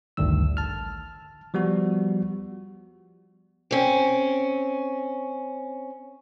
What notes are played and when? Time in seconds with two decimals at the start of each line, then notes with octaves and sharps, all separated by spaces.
0.17 A1 D2 G2 D#3 E6
0.57 A5 F6
1.54 F3 G3 B3 F#4
3.71 C4 C#4